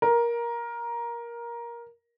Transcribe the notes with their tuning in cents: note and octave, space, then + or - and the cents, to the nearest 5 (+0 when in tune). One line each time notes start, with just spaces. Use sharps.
A#4 +15